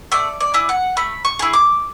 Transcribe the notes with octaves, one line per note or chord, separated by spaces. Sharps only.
A3 D5
D5
E4 G#4
F#5
A3 B5
C#6
E4 G#4
D6